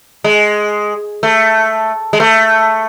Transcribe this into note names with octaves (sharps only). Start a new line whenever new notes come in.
G#3
A3
G#3
A3